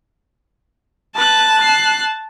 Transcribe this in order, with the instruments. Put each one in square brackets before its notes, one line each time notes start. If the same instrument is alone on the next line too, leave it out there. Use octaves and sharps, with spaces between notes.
[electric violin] B4 F#6 [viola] A5
[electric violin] F#6 C7